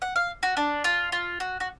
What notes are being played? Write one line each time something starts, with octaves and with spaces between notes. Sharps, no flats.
F#5
F5
F#4
D4
F4
F4
F#4
F#4